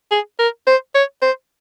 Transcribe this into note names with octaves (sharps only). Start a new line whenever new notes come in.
G#4
A#4
C5
C#5
C5